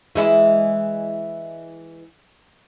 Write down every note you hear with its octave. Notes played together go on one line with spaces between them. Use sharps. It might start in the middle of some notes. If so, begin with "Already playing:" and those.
E3 G#3 E4